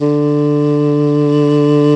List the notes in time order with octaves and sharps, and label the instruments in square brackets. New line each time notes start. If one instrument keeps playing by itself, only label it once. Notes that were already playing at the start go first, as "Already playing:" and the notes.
[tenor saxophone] D3